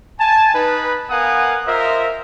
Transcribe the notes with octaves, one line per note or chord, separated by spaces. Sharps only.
G#5 A5
D#4 B4
B3 A#4 F5 F#5 G#5 D#6
F4 A#4 C5 D#5 E5